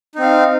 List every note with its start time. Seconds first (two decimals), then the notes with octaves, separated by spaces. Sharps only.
0.15 D#4
0.19 C4
0.22 F5